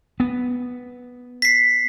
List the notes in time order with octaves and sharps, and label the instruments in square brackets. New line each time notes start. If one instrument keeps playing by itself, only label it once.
[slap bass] B3
[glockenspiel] B6 C7